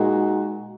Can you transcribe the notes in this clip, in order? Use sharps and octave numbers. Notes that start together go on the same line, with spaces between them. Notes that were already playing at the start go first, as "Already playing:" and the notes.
Already playing: A#2 G#3 D#4 F#4